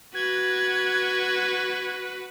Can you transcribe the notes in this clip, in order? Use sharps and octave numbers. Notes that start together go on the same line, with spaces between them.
F#4 B4 G#6